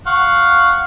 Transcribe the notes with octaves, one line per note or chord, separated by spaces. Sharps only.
F5 F#5 C#6